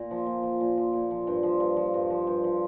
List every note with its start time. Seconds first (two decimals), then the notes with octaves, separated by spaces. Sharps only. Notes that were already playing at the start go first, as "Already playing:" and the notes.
Already playing: A#2
0.11 F3
0.26 A#2
0.43 F3
0.60 A#2
0.77 F3
0.93 A#2
1.11 F3
1.27 G2
1.43 F3
1.60 G2
1.77 F3
1.94 G2
2.10 F3
2.27 G2
2.44 F3